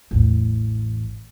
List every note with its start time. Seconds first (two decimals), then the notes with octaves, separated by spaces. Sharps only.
0.11 A1 E2